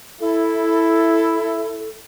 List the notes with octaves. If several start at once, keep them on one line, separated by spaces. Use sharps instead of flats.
E4 A4